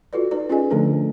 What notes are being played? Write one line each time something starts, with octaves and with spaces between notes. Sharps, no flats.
F4 F#4 A4 B4 D5
D#4 B4 D5
C#4 F4 G#4 B4 D#5 G#5
D3 F3 A3 D4 A4 A#4